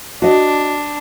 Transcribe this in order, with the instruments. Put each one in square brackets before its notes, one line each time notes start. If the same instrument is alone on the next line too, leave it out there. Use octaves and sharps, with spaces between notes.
[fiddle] D4 [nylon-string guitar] F#4 D#5